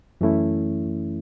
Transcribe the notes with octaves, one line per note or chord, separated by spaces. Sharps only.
F#2 E3 A3 C#4 E4